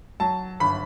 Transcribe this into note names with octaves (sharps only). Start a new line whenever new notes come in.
F#3 A5
G1 B5